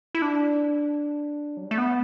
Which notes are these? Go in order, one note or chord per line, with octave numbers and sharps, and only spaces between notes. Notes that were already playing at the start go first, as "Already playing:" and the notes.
E4
D4
F#3
G3
A3
B3